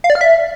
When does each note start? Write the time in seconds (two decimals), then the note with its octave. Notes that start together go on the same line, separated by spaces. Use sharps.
0.04 F5
0.10 D5
0.15 F6
0.21 E5